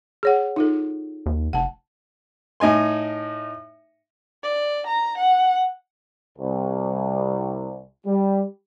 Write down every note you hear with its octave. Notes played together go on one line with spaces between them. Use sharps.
G#4 C#5 F#5
D#4 F4 A4
D#2
F1 F#5 A5
A2 D#4 G#5 C6
D5
A#5
F#5
C2
G3